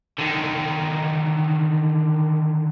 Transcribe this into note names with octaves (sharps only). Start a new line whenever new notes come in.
D3 D#3